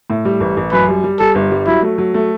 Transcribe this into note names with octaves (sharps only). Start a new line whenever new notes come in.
A2
G3
A1
A1
F#2 B4
G3
G3
G3 A4
G1
G3
F#3 E4
A3
F#3
A3